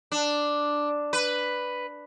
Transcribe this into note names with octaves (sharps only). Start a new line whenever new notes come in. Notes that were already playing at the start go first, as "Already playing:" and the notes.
D4
B4